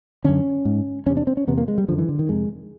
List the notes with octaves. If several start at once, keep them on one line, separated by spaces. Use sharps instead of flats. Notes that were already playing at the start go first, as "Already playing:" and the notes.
F#2 D3 C#4
G#2
E2 C3 C#4
D4
C4
C#4
E2 C3 B3
A#3
G#3
G3
F#2 D3 F3
E3
D3
D#3
F2 C3 G#3